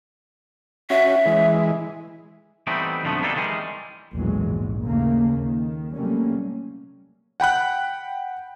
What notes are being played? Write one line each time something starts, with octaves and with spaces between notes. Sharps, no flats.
C#4 F#4 E5
E3 G#3
E3 G3 A3 B3 C4 D#4
B1 F2 D3 F3 A3 B3
B2 G3 A#3 D4 D#4 A4
D#3 E3 G3 G#3
A#1 E2 A2 E3 F#3 G#3
A#1 G#2
D#2 C#3 A3 A#3
D#3
C3 F#3 G3 A3 A#3 C#4
F#5 G5 B5 F#6